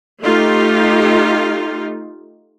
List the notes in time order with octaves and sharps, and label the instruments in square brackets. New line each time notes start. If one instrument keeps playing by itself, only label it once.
[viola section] A3 D#4 F4 G4